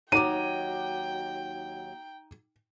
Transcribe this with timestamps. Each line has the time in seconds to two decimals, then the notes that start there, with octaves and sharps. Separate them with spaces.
0.12 D#2 F#3 D#4 G5 D6 D#7